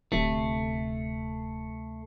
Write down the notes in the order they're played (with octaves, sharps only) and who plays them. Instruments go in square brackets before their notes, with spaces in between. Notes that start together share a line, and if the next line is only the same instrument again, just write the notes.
[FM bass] D1 [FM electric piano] D2 C3 C7 [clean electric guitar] A3